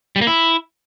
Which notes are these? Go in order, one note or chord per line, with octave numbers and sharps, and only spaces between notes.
G3
A#3
E4